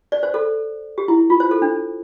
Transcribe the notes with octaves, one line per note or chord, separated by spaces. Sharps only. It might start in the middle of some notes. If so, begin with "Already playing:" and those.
D5
C5
A4
G4
E4
F4
C5
A4
D4